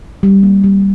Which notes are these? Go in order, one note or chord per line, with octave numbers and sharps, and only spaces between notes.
G3
A#3
G3